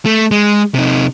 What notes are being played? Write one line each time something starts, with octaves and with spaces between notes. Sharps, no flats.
A3
G#3
C3 D#4